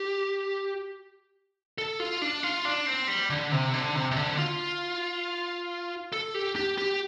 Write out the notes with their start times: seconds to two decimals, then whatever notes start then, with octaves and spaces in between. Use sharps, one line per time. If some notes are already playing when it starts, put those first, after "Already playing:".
Already playing: G4
1.78 A4
2.00 F4
2.22 D4
2.43 F4
2.65 D4
2.86 C4
3.08 G3
3.30 D3
3.52 C3
3.74 D3
3.95 C3
4.11 C3
4.17 D3
4.38 F4
6.13 A4
6.34 G4
6.56 G4
6.78 G4